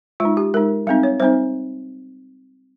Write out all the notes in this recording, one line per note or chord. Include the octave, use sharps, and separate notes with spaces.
G#3 F4
D#4
G4
G#3 D#4 A#4
G3 C4 D#4 F5
C#5
G3 C4 D#4 C5